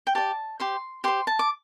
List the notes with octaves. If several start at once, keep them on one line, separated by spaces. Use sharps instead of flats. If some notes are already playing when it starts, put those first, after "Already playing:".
G5
G4 D5 A5
G4 C5 C6
G4 C5 C6
A5
D6